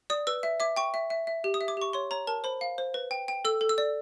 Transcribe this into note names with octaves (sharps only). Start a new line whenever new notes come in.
D5 D#6
B4 E6
E5
E5 D6
G5 C#6
E5
E5
E5
G4
D#6
E5
D6
G4 C#6
C#5 C6
C#5 A#5
A#4 A5
C5 B5
F5
C5
B4
G5
G5
A4 E6
A4
E6
D5